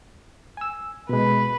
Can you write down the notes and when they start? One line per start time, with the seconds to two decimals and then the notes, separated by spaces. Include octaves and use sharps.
0.57 G#5 E6
1.09 B2 G#3 B4